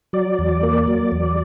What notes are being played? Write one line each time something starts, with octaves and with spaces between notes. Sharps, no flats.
F#3 D5
E2
A#3
F#3
E2